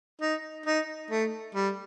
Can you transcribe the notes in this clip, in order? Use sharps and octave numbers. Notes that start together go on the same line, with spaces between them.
D#4
D#4
A3
G3